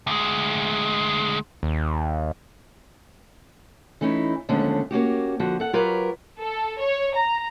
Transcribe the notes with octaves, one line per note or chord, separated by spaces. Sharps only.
D2 G#3
D#2
E3 A3 C#4 D#4 E4
D#2 D3 F3 G#3 A3 C#4
A#3 C#4 F#4 G4
D3 F3 F#4
A4 F#5
F#3 F4 G4 A#4 B4 C#5
A4
C#5
A#5